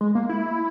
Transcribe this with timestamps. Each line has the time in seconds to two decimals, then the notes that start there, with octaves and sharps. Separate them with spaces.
0.01 G#3
0.15 A#3
0.29 E4